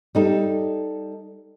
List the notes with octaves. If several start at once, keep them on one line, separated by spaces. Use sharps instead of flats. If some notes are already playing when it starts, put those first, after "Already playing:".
G3 D#4 A4